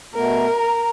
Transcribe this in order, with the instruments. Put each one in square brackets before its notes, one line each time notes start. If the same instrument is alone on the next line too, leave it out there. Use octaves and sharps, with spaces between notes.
[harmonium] B2 A3 B3 [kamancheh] A#4
[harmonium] A#5